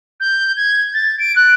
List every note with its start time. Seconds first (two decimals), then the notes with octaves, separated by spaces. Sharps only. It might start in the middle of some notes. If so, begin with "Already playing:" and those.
0.20 G6
0.57 G#6
0.94 A6
1.19 D7
1.36 F#6